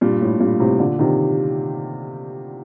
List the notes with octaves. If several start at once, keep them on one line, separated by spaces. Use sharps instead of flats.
G2 A#2
A2
G2 A#2
A2 C3
A#2 D3
C3 D#3